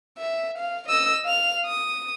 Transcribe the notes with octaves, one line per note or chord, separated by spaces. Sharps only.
E5
F5
D#5 E6
F5 F7
D#6